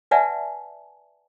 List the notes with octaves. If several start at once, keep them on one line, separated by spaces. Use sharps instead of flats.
B4 D5 E5 F#5 G#5 A5